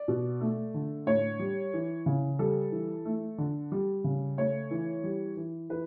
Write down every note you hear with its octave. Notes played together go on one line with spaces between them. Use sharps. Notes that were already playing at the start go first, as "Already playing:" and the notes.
Already playing: D5
B2
A3
D3
A2 C#5
G3
E3
C#3
G3 A4
E3
A3
D3
G3
C#3
A3 C#5
E3
G3
E3
E3 B4